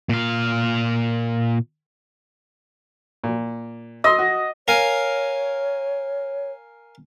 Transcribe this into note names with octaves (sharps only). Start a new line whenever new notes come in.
A#2 F5
A#2
D#5 C6 E6
F#4
A#4 C#5 F5 G#5